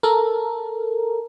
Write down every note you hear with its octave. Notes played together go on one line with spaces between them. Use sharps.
A4 A#4